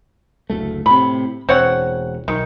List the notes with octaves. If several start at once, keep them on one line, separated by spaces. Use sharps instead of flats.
F#1 D2 A3
A2 C3 B5
E1 C4 C#5 F#5
B1 D#3